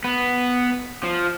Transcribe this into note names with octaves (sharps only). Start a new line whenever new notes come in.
B3
F3